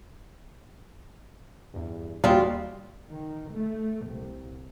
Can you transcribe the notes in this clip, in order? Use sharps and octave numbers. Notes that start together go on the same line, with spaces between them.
E2 G2
D#2 G3 G#3 A#3 C4 F4 F#4
D#3
A3
C2